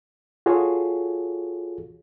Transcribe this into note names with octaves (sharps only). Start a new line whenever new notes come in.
F4 F#4 G#4 A4 C#5